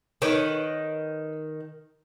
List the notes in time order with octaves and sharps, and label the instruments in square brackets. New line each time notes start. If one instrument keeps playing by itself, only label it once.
[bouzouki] D#3 [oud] B4 C#5